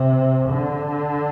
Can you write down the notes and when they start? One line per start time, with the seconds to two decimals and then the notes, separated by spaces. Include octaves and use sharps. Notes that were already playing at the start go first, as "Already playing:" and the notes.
Already playing: C3
0.49 D3